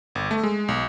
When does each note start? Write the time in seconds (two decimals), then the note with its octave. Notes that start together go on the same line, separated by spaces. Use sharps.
0.15 G1
0.31 A3
0.43 G#3
0.68 B1